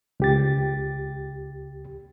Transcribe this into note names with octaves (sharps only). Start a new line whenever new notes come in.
C#2 G4 A6